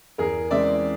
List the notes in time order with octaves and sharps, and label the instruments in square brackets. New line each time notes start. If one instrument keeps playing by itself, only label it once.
[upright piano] E2 G#4 A#4
C#3 E3 G#3 C4 D5 E5